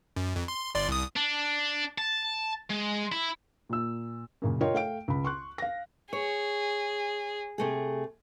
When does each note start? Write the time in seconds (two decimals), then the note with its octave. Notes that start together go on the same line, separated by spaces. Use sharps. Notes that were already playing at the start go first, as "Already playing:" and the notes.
0.16 F#2
0.36 F2
0.48 C6
0.75 G1 D5 C6
0.88 C2 D#6
1.16 D4
1.98 A5
2.70 G#3
3.12 E4
3.69 A#2 E6
4.42 F#2 A#2 C#3
4.61 F4 A#4 C#5 D#5 G5
4.74 A3 F5 G5 D7
5.08 C#2 B5
5.25 C6 C#6 F#6
5.58 F5 A#6
6.13 G#4 C#5
7.58 C3 A3 G#4